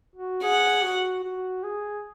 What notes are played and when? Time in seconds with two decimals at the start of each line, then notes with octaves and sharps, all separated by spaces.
0.16 F#4
0.43 G#4 F#5
0.84 F#4
1.23 F#4
1.64 G#4